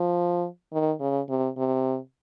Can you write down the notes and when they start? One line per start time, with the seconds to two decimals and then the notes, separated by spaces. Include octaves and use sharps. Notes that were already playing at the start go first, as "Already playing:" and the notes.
Already playing: F3
0.73 D#3
1.00 C#3
1.29 C3
1.57 C3